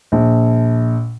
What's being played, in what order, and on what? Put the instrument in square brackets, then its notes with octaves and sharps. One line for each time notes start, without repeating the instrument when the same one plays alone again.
[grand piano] A#1